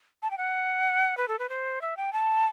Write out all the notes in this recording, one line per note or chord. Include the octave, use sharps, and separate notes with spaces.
A5
G5
F#5
B4
A4
B4
C5
E5
G5
A5